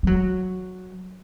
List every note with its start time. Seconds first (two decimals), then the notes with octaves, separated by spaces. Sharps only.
0.03 G3
0.07 F#3